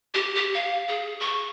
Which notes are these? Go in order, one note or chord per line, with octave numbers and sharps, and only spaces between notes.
G4
G4
F5
G#4
C#6